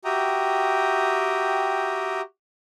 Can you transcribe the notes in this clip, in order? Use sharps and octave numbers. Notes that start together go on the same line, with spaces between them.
F#4 G4 E5 G5 A#5 D#6